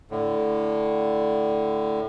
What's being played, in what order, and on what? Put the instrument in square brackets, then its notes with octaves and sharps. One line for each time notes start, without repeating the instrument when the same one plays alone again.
[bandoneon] A2 D3